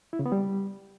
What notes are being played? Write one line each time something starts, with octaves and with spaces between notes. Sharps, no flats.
E4
C#3
B3
G3